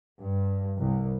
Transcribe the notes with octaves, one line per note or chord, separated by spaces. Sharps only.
G2
C2